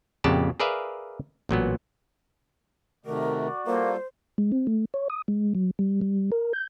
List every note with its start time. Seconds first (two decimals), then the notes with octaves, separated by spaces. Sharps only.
0.24 F2 A#2 C#3 G4 F#5 A5
0.60 G#4 A#4 B4 D5 E5 F5
1.49 A1 A#2 F#3 B3
3.06 C3 D#3 A3 F#4 A#4 D5
3.67 G3 A#3 F4 A4 C5
4.38 G#3
4.52 C4
4.67 A3
4.94 C#5
5.10 D#6
5.28 G#3
5.55 F#3
5.79 G3
6.01 G3
6.32 A#4
6.53 G6